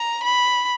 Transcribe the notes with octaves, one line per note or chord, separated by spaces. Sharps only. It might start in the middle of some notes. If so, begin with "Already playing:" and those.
Already playing: A#5
B5